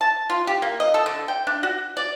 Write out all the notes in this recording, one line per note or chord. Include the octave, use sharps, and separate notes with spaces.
A5
F4
G4
A#3
D#5
A4
D3
G5
D4
F#4
D5